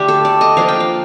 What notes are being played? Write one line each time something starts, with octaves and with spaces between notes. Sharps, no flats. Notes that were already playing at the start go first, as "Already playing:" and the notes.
Already playing: D3 A3 D4 G4
A4
D5
D#5
F3 A#3 D4 F4 F5
G5
F5